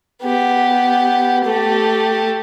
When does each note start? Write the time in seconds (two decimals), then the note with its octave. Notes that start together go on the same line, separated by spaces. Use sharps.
0.22 B3 G4
1.44 A3 G4